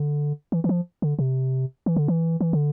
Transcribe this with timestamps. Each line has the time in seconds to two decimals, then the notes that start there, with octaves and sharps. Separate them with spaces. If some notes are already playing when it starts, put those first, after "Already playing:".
Already playing: D3
0.52 E3
0.64 E3
0.69 F3
1.02 D3
1.19 C3
1.86 E3
1.96 D3
2.08 E3
2.41 E3
2.53 D3